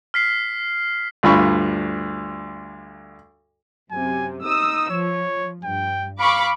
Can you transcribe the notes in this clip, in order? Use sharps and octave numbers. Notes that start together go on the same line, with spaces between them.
F6 B6 C7
D2 G2 F4 B5 C#6
F#2 C3 G#5
D#4 D#6 E6
F3 C#5
G2 G5
F5 B5 C#6 D6